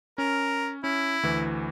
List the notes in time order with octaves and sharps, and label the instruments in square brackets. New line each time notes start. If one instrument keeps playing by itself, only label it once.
[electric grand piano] C#4 [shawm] A#4
[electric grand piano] C#4 [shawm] E4
[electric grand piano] D2 E3